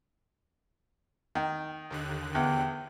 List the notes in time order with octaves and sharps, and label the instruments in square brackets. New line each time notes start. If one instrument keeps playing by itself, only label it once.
[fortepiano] D#3
[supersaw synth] D#2 D3 F#6
[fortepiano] E2 [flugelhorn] G5